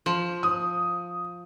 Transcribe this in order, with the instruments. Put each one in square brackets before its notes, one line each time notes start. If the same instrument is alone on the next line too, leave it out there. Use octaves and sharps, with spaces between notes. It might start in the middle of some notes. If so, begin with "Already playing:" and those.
[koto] F3
[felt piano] D#6